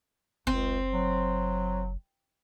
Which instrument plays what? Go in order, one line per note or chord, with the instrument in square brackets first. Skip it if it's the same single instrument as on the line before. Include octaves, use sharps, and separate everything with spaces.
[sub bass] F#1 [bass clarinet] C#2 [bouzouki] C4
[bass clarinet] F#3